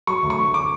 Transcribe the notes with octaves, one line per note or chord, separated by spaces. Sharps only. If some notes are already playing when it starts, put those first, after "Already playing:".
F#3 C#6
D2
C#6
D3
D6